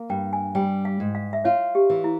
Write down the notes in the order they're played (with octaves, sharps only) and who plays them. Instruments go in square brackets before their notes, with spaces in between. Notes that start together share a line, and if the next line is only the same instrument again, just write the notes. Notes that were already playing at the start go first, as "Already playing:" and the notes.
Already playing: [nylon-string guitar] A#3
[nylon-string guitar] G2 [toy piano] G5
[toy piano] G#5
[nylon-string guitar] G3 [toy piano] G5
[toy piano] F5
[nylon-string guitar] G#2
[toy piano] F5
E5
[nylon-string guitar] F4 [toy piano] C#5
[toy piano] G4
[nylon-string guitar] E3
[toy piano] E4